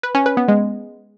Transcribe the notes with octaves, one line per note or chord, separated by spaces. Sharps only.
B4
C#4
B4
B3
G#3